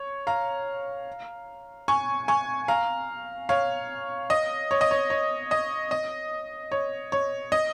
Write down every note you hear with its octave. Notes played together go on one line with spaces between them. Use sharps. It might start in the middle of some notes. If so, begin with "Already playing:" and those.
Already playing: C#5
F5 A#5
G#5 C#6
G#5 C#6
F5 A#5
C#5 F5
D#5
C#5
D#5
C#5
C#5
D#5
D#5
C#5
C#5
D#5